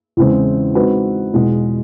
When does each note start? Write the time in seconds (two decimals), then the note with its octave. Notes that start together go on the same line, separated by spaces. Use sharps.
0.17 E2 C#3 E3 G#3 C4
0.75 G#3 C4 D#4 F#4 B4
1.34 E2 B2 G#3